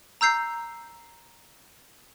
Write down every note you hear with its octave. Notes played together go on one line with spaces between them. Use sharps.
A#5 E6 G6 C7